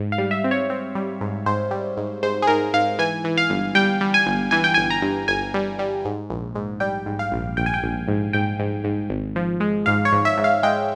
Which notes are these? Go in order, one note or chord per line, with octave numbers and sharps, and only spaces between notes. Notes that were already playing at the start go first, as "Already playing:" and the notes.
Already playing: G#2
F5
G3
E5
C4
C#5
C4
G3
G#2
G#2 C5
G3
G#2
G#2 C5
G#4
G#2 A#4
G#2 F5
E3 G#5
E3
F5
G1
G3 G5
G3
G#5
G1
E3 G#5
G5
G1 G#5
A#5
G2
G1 G#5
G3
G3
G#2
A#1
G#2
G3 G5
G#2
F5
A#1
A#1 G5
G#5
G5
A#1
G#2
G#2 G5
G#2
G#2
G#1
F3
G#3
G#2 F5
C#5
G#2
E5
G#2
F5
G#3 G5